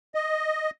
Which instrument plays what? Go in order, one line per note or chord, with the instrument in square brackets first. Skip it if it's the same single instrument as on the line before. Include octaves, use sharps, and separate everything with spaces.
[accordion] D#5